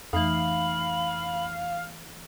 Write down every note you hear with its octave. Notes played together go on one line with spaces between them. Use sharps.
F2 E3 A3 D#4 F5 B5